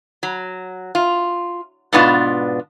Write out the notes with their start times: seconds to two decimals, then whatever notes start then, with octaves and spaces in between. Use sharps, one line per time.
0.23 F#3
0.95 F4
1.93 G#2 B2 B3 D4 F4